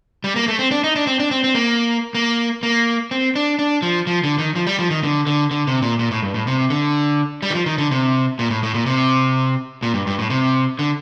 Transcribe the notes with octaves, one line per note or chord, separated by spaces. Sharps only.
G3
A#3
A3
C4
D4
D#4
D4
C4
D4
C4
C4
A#3
A#3
A#3
C4
D4
D4
F3
F3
D3
D#3
F3
G3
F3
D#3
D3
D3
D3
C3
A#2
A#2
A2
G2
A2
C3
D3
G3
D#3
F3
D#3
D3
C3
A#2
A2
A2
A#2
C3
A#2
G2
G2
A2
C3
D3